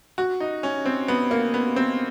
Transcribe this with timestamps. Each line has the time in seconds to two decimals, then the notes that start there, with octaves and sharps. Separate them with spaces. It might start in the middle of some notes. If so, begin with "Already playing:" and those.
0.18 F#4
0.40 D#4
0.63 C#4
0.86 C4
1.08 B3
1.31 A#3
1.54 B3
1.76 C4